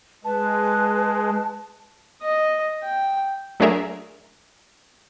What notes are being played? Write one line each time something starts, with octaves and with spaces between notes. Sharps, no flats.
G#3 B4 A5
D#5
G5
F#3 A3 D4 G#4 A#4 E5